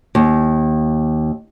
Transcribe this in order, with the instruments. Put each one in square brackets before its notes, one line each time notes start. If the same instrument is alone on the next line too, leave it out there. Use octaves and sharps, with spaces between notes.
[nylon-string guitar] D#2